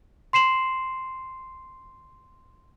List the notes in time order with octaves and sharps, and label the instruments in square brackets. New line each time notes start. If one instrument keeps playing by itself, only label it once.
[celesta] C6 C7 E7 F#7